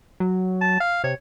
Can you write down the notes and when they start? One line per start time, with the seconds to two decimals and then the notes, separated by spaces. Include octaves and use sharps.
0.20 F#3
0.61 A5
0.81 F5
1.04 C3 C#5